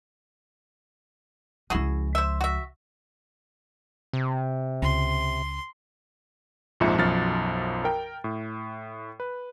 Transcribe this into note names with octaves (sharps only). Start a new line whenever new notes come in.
C#2 F3 E4 F#4 G#4
C5 E5
F#4 E5
C3
C#2 C6
A#1 F2 G#2 F3 E5 C#7
B1 F#2 F3 F6 A6
A#4 G5
A2
B4